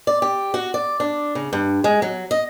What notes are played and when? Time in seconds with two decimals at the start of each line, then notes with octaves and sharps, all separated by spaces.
0.07 D5
0.22 G4
0.54 F#4
0.74 D5
1.00 D4
1.35 C#3
1.53 G2
1.84 G#3
2.02 F#3
2.31 D#5